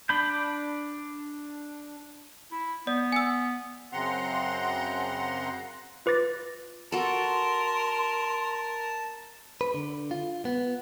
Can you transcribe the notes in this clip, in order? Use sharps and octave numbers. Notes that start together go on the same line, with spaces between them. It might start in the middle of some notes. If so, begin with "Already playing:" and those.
D4 B5 G6
E4
B3 D5
G#5 E6
F#2 C#3 C4 F#5 A#5 C6
F4 B4 D6 A6 A#6
F#4 A4 A#4 A5 C6
B4
D3
F4
B3